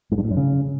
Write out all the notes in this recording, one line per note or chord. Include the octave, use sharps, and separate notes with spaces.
G#2
G2
A2
F#2
C#3